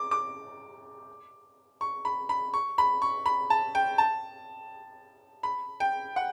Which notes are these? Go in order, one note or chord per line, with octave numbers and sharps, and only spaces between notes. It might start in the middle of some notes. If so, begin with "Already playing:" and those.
Already playing: D6
D6
C#6
B5
B5
C#6
B5
C#6
B5
A5
G5
A5
B5
G5
F#5